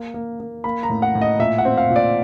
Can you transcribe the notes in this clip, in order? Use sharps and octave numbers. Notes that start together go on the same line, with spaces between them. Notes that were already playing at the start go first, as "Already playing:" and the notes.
Already playing: A#3
A#3
A#3
A#3 B5
A#5
A2
F#5
A2
D#5
A#2 E5
F#5
C4
F5
A#2
D5